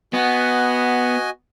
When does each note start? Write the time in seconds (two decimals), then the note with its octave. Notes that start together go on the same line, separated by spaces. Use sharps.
0.13 B3 F#4 D#5 G#5